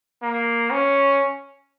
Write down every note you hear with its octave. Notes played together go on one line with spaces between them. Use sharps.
A#3
C#4